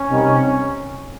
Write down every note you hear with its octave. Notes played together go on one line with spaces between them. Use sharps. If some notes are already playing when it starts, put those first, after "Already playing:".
Already playing: C#4
C3 D#3 G3